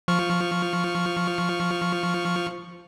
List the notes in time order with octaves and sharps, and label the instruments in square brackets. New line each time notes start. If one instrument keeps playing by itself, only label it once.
[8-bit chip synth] F3 C#6 F6